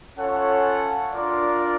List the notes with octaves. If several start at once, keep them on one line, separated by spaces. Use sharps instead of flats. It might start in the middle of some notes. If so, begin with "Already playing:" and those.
C#4 F4 A4 C#5 F#5
D4 F4 A#4 D5